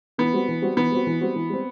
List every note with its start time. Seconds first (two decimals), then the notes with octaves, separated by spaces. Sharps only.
0.18 E3 B3
0.33 G3 C4 F#4
0.48 E3
0.62 G3 C4 F#4
0.77 E3 B3
0.91 G3 C4 F#4
1.07 E3
1.21 G3 C4 F#4
1.36 E3
1.50 G3 C4